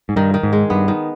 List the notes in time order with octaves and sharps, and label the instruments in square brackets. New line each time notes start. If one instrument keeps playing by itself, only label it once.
[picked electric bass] G#2
[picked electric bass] G2 [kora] D#3
[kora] D#3
[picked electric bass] G#2
[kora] G#3
[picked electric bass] G2 [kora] B3
[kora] D#3